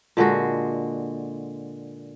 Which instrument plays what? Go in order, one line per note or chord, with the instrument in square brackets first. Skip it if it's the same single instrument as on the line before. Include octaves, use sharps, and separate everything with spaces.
[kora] A#2 D3 G#3 F#4